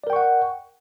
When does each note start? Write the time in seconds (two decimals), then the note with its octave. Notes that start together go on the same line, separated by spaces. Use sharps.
0.04 D5
0.07 A#4
0.10 G5
0.13 C#6
0.16 F#5